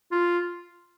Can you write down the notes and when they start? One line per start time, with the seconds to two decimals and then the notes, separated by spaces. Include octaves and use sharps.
0.12 F4